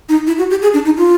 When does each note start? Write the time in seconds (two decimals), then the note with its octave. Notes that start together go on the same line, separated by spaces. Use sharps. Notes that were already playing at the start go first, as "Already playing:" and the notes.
0.09 D#4
0.27 E4
0.38 F#4
0.50 G4
0.62 G#4
0.74 D4
0.85 D#4
0.98 F4